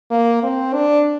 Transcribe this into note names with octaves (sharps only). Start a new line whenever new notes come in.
A#3
C4
D4